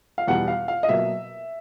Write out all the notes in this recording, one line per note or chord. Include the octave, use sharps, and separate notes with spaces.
F5
E2 B2 G3 B3 F#5
F5
F5
D#5
B2 F#3 A#3 E5